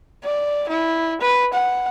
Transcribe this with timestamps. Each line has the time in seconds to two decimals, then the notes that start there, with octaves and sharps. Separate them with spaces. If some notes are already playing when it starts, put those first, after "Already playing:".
0.24 D5
0.68 E4
1.21 B4
1.53 F#5